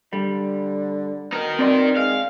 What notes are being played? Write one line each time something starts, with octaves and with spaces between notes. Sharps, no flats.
D3 G3
B2 D#4 A#4
C4 D5 C6
G#3 F5